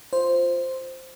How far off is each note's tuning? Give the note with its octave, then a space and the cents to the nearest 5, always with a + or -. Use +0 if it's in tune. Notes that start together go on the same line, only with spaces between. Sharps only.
F4 +0 C5 +0